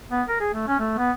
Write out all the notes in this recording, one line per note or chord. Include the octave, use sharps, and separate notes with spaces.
B3
A#4
G#4
A3
C#4
A3
B3